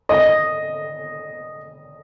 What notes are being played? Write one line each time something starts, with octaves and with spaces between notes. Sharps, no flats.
D#5